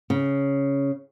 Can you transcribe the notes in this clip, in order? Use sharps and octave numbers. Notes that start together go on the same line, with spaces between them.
C#3